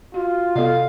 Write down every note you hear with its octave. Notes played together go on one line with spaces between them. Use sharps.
F4 F#4
C3 B3 A4 D5 D#5 F5